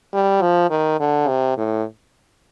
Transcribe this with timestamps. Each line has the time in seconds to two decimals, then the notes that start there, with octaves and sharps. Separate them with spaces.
0.14 G3
0.42 F3
0.70 D#3
1.00 D3
1.28 C3
1.57 A2